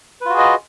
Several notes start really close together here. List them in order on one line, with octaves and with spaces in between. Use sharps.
B4 F4 F#4 G#4 D#5